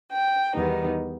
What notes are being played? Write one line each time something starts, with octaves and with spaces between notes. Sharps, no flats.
G5
E2 D#3 G3 B3 D#4